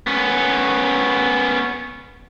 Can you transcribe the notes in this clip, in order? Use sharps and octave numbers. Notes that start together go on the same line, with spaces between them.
B3 C#4